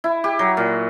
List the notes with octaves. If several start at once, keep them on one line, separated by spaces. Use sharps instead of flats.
E4
G4
F#3
A#2